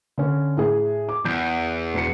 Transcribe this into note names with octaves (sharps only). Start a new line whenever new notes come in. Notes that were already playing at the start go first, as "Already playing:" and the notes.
D3 C#4
A2 G#4
D6
E2 G6
E1 C7 C#7